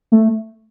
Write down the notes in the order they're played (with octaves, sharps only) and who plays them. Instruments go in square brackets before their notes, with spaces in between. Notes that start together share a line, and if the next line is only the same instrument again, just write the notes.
[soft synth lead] A3